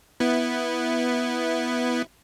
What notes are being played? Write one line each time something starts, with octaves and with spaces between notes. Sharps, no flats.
B3 E4